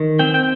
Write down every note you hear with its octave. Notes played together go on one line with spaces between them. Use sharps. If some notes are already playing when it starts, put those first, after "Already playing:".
Already playing: D#3
C4 G5
G5